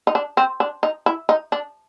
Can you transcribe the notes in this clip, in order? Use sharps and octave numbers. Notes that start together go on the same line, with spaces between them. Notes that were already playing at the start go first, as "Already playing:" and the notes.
D#4
D4
C4
D4
D#4
E4
D#4
D4